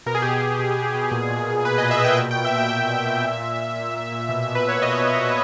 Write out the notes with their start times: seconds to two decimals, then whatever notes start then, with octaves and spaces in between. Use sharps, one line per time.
0.06 B2 A#4
0.15 G#4
0.22 B2 G4
0.31 G#4
0.42 B2
0.59 B2
0.77 B2
0.94 B2
1.12 A#2
1.30 A#2
1.47 A#2
1.65 A#2 B4
1.78 A#2 D#5
1.91 E5
2.01 A#2 G5
2.18 B2
2.31 G5
2.36 B2
2.45 E5
2.54 B2 G5
2.70 B2 E5
2.88 B2
3.06 B2
3.24 A#2
3.41 A#2
3.59 A#2
3.76 A#2
3.94 A#2
4.12 A#2
4.29 B2
4.46 B2
4.55 B4
4.65 B2 C#5
4.82 B2 D#5
5.00 B2
5.17 B2